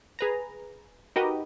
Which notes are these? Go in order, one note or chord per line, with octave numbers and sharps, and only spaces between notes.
G#4 B4 A#5
D#4 F#4 G4 A#4 B4 D#5